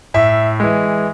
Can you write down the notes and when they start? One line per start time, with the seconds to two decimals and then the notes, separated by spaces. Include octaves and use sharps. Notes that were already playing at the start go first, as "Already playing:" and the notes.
0.14 A2 E5
0.60 E3 G#3